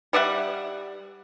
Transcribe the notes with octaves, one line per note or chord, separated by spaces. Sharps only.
G3 D5 E5 F#5